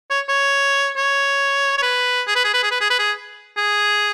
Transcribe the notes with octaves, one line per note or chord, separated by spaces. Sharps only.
C#5
C#5
C#5
C#5
B4
G#4
B4
G#4
B4
G#4
B4
G#4
B4
G#4
G#4